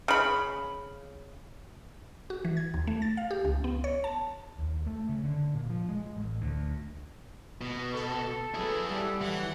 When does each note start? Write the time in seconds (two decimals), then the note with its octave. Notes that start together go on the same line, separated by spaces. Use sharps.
0.08 C#3 B5
2.30 F#4
2.45 E3
2.57 G#6
2.74 D#2
2.87 A3
3.02 A6
3.17 F5
3.31 G4
3.45 C#2
3.64 B3
3.84 C#5
4.04 A5
4.59 D#2
4.86 A3
5.09 C#3
5.24 D3
5.55 A#2
5.69 F3
5.89 G#3
6.17 A1
6.42 D2
7.61 B2
7.94 A4
8.54 F#3 E4 G#4 B4
8.87 G3 F#5
9.21 E3 F#3 F#5